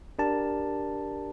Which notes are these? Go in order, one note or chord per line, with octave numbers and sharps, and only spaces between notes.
D4 G4 A#4 A5